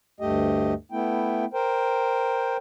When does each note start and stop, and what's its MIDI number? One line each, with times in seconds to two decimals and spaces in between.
0.20 0.74 38
0.20 0.74 43
0.20 0.74 57
0.20 0.74 67
0.20 0.74 75
0.92 1.45 57
0.92 1.45 59
0.92 1.45 64
0.92 1.45 79
1.53 2.57 70
1.53 2.57 72
1.53 2.57 79